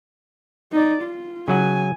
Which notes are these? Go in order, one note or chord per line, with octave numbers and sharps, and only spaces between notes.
D#4 D5
F4
C#3 F#3 F#5 G#5